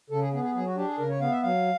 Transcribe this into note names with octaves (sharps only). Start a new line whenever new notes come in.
C#3 A4
G#4
B3 G#4
G#4
F#3 G#4
F#4
D4 G4
G#4
C#3 A#4
C#5
B3 F5
E5
F#3 F5